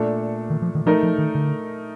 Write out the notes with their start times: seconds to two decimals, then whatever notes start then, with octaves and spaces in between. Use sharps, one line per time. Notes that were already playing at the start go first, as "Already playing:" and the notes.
Already playing: A#2 A3 D4 A4
0.50 D#3
0.62 F3
0.75 D#3
0.86 F3 A3 D#4 A#4
1.03 F3
1.18 D#3
1.35 D3